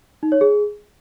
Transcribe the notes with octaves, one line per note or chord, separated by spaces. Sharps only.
D#4
C#5
G#4